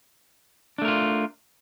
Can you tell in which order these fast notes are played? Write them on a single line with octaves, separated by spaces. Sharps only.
D4 A3 A#4 F4